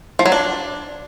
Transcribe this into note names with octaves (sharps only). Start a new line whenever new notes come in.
F3
F#3
D4